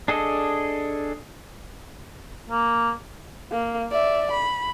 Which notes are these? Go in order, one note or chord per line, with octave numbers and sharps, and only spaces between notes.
D4 G#4 A4 D#5
A#3
A#3
D5 E5
B5